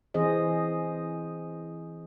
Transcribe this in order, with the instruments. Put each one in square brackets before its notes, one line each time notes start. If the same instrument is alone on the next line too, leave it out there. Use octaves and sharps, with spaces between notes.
[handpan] E3 C4 G#4 C5 D#5